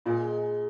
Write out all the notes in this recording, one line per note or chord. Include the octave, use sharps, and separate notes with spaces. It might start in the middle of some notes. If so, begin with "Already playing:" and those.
A#2 G#3